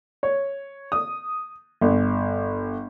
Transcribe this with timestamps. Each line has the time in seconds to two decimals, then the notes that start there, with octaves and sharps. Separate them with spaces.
0.23 C#5
0.92 D#6
1.81 G1